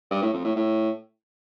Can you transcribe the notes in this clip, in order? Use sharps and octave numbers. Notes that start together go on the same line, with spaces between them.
G2
A2
F2
A2
A2